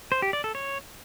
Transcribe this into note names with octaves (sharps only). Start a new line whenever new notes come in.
C5
G4
D5
A4
C#5